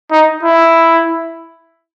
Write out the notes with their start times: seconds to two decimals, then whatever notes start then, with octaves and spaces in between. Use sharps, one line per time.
0.12 D#4
0.43 E4